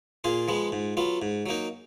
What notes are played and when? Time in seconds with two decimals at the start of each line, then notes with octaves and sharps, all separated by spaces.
0.24 A#2 F4 G#4
0.48 F3 G#3 B3
0.72 G#2
0.97 F#3 B3 F4
1.22 G#2
1.46 F#3 A#3 D#4